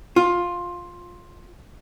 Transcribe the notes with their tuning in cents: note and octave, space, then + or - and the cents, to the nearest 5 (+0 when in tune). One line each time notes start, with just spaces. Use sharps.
F4 +10